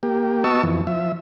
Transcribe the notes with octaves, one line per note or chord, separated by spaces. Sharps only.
A#3 G4
B3 F#4 D#5 A5 C#6 E6
F2 E3
F3 E5